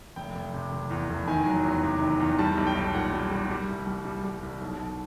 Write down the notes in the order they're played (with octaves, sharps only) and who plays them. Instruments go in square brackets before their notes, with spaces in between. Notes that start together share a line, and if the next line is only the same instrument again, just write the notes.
[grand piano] F1 G5
F1
C3
F1
E2
F1
D#3 G#5
F#3
E2
C3
D#3
E2
G3 A5
B1
G5
B1
A#2 F#5
G3
G3
G3
C2
G3
G3
G3
C2
B1
B1